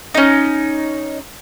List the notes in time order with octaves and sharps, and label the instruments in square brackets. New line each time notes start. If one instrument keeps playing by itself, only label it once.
[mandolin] C#4 D#4